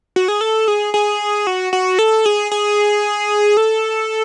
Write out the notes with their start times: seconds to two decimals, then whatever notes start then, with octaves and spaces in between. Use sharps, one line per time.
0.16 F#4
0.28 G#4
0.41 A4
0.68 G#4
0.94 G#4
1.47 F#4
1.73 F#4
1.99 A4
2.26 G#4
2.51 G#4
3.57 A4